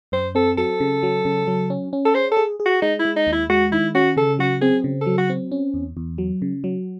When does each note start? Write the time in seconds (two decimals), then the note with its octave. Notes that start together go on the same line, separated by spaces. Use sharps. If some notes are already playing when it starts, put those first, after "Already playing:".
0.12 F#2 C5
0.35 C4 A4
0.57 F#3 A4
0.80 C#3
1.03 F#3
1.25 C#3
1.47 F#3
1.70 C#4
1.93 C#4
2.05 A4
2.15 G#4 C5
2.31 A4
2.37 G#4
2.60 G#4
2.66 F#4
2.82 G#3 D#4
2.99 E4
3.05 G#3
3.16 D#4
3.27 D#2
3.32 E4
3.49 G#3 F#4
3.72 D#3 E4
3.95 C#4 F#4
4.17 C#3 A4
4.39 F#3 F#4
4.61 C4 G#4
4.84 C#3
5.01 A4
5.06 F#3
5.18 F#4
5.30 C4
5.52 C#4
5.74 E2
5.97 E2
6.18 F#3
6.42 C#3
6.64 F#3